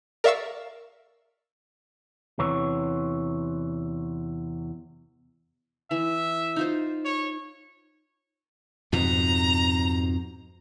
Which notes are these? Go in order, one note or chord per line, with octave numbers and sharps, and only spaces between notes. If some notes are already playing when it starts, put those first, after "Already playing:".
A#4 D5 E5 F5 C#6 E6
E2 C3 E3 C#5
E3 E5
D#4 F4 C5
C#5
F2 G#2 B2 A#5